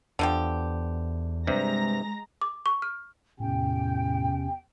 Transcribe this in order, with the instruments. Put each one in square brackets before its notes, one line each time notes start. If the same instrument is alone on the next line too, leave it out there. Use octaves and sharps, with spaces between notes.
[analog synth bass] E2 [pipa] D3 F3 G4
[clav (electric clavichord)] G2 C3 [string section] G#3 A#5 A#6
[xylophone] D6
C#6
F6
[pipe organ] E2 C3 C#4 [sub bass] A2 [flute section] G5